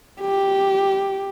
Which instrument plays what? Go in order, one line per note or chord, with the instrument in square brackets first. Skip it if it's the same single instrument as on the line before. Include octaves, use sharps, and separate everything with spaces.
[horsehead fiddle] G4